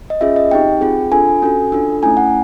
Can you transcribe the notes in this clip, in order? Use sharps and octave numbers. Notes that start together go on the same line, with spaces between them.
D#5
C#4 F4 G#4 E5
D#5
C4 D#4 G4 G5
C4 F4 G#4
D4 F4 A4 G#5
C#4 F#4 A4
D4 F4 A4
A3 C#4 E4 G#5
F#5